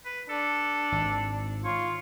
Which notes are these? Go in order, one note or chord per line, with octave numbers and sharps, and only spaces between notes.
B4
D4 A4
G#1
F4 C#5